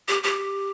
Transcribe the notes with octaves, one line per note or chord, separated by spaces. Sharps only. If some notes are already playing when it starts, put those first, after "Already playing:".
G4
G4